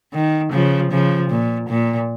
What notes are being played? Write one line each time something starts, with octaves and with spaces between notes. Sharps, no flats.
D#3
C#3 F3
C#3 F3
A#2
A#2